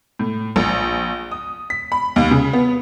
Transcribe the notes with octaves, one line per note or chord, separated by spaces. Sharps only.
A2
A#1
D#6
B6
B5
D#2
C#3
B3